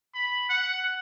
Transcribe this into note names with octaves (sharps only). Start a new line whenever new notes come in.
B5
F#5